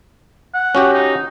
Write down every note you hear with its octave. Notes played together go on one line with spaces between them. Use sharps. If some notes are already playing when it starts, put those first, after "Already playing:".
F#5
C#4 F#4 G4
D#4